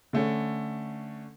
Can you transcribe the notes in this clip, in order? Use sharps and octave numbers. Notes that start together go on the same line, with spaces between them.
D3 A3 C#4